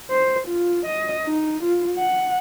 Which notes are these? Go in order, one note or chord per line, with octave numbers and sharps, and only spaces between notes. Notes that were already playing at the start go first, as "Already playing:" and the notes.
C5
F4
D#5
D#4
F4
F#5